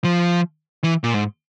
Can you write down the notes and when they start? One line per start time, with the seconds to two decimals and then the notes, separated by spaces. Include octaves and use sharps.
0.04 F3
0.84 E3
1.04 A#2
1.14 G#2